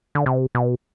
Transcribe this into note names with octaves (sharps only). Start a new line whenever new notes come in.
D3
C3
B2